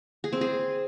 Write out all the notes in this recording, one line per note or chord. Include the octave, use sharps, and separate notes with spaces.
G#4
C4
G#4